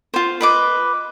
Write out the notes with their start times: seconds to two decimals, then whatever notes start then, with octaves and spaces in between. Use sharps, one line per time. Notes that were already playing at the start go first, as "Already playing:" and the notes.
0.14 F4 C5
0.41 B4 D#5 D6